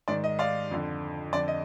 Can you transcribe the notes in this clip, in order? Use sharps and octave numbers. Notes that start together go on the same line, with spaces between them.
G#2 D#3 D5
D#5
D5 F5
F2 D3
F2 D3 D5
D#5